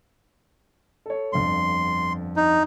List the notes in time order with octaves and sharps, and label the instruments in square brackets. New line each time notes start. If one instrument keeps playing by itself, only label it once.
[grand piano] A4 C#5
[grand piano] G1 F2 [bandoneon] C6
[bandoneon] D#4